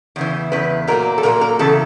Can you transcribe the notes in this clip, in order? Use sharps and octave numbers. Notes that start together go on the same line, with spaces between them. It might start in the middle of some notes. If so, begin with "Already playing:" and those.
E2 C#3 E3
E2 C#3 B4
A#2 F#3 A#3 A#4
A4
A#2 F#3 A#3 A#4
A#4
E2 C#3 A4